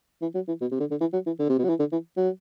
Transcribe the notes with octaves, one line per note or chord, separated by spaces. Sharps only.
E3
F#3
E3
B2
C3
D3
D3
E3
F#3
E3
D3
C3
B2
F#3
E3
D3
E3
F#3